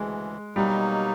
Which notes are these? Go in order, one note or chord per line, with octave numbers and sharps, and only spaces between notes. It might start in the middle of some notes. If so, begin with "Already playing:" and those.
Already playing: D2 C#3 E3 G#3
B2 F#3 G3 A#3 D#4